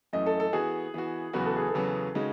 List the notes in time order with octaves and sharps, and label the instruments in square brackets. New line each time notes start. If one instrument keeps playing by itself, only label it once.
[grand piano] F#2 E3 A3 [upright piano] D#5
[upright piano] A4
A4
[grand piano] E3 B3 F#4 [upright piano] G#4
[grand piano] E3 B3 F#4
[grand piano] E2 C#3 F#3 B3 F#4 [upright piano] B4
[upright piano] A4
G#4
A4
[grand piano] E2 C#3 F#3 B3 F#4
C#3 G#3 D#4 F#4